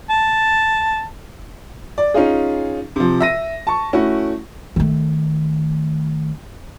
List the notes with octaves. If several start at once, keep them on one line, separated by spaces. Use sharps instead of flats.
A5
D5
C#4 D#4 F4 G#4
C3 F3
E5 A#6 D#7
A5 C#6
A3 C#4 E4 F#4
D#3 A3